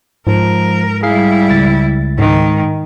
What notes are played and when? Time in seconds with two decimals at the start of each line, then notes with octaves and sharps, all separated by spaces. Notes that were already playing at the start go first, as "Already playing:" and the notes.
0.27 G#2 F3 A#4
1.03 G3 E4 G#4 F5 C7
1.50 C#2 A6
2.18 G#2 D#3